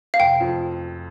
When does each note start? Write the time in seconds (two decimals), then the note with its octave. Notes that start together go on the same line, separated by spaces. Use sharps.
0.14 F5
0.20 F1 G5
0.40 F2 F3